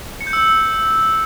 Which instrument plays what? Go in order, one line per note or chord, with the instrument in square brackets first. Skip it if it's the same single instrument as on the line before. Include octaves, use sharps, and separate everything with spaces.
[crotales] C#7
G6
E6